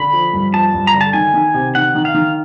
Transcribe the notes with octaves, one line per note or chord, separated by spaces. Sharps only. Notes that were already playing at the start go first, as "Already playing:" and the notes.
Already playing: D3 B5
F3
G2
F3 A5
G2
A#5
D3
A5
D#3 G#5
D#3
C3
D#3 F#5
D#3
F5
D#3